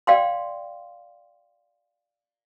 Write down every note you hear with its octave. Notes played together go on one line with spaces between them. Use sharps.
D5 F5 G5 C6